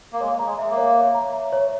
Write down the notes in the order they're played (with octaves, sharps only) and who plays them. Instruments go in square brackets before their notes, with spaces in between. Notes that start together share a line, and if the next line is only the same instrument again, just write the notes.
[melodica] A#3
[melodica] G#3 [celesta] C#5
[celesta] A#5
[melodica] G#3
[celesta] E5
[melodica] A#3
[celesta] C#5
C#5
A#5
E5
C#5